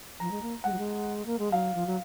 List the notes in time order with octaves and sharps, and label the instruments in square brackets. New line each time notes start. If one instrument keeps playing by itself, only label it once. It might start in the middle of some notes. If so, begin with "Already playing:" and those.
[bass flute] F3 [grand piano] A#5
[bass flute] G#3
A#3
[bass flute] G#3 [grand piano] F#5
[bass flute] F#3
G#3
A#3
G#3
[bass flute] F#3 [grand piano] F5
[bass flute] F3
F#3